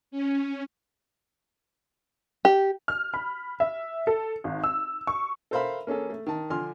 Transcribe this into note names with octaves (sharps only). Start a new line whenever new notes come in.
C#4
G4
F6
B5
E5
A4
G#1
E6
C#6
A4 A#4 C5 E5 F5 B5
A#3 C#4 G#4 A4
A3
D#3 A5
D3 F3 G#5 C6 F6